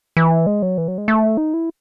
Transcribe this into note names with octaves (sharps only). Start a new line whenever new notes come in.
E3
G#3
F#3
E3
F#3
G#3
A3
D#4
E4